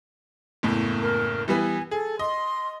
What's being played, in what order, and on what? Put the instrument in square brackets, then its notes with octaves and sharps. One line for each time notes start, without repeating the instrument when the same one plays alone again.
[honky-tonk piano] F#1 E2 A2
[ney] A#4
[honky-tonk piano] E3 G3 B3 [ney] G#5
[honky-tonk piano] G#4 [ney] A4
[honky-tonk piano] D#5 [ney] C6